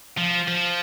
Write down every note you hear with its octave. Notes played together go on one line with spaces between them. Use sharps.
F3
F3